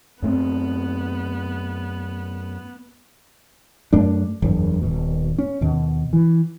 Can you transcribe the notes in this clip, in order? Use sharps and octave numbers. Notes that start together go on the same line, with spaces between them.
F#2 A3 B3 C4
F#2 A3 D4
F#1 E2 G2
D#1 B2
C#4
D#2 B2
E3